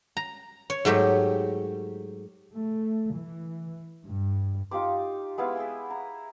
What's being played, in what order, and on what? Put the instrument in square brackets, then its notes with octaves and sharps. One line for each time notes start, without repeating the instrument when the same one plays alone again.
[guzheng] A#5
C#5
G#2 F#3 A3 G4
[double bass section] A3
E3
G2
[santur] D#4 F4 G4 D6
G#3 B3 E4 F5
G#4 E5 G5 G#5
A#5